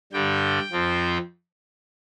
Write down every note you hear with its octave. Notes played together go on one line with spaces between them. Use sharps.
G2 D3 G3 G5
F2 F3 C4